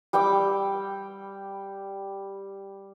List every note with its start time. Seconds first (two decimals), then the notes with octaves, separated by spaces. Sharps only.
0.13 G3 G5 D6 E6